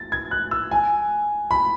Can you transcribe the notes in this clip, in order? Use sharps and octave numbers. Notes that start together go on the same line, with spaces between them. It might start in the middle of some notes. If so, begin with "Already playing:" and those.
Already playing: A6
G#6
F#6
E6
G#5
B5